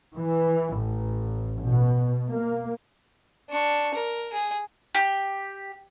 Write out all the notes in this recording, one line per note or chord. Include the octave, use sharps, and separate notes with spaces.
E3
A1
B2
A#3
D4 C#6
A#4
G#4
G4